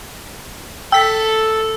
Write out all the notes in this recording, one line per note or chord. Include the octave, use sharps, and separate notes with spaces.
A4 G5 E6 B6